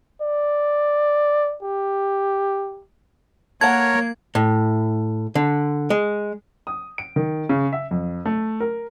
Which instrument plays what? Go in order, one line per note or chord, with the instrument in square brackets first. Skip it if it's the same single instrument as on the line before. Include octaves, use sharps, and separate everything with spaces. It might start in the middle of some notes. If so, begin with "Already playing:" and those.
[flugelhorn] D5
G4
[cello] A#3 [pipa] A4 F#5 [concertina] A#4 C#5 [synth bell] G#6
[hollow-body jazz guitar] A2
D3
G#3
[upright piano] D#6
D7
D#3
C#3
E5
F2
A3
A#4